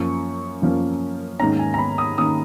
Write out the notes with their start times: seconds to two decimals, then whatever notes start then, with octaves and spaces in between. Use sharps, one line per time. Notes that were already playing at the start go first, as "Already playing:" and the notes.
Already playing: F#2 F3 A#3 C#4 C#6
0.62 F#2 F3 A#3 C#4
1.40 G#2 D#3 A#3 C#4 A#5
1.59 G#5
1.74 A#5
1.78 B5
1.98 D#6
2.18 D#3 A#3 C#4 D#6